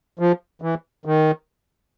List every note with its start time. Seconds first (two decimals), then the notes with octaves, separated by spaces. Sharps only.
0.19 F3
0.62 E3
1.05 D#3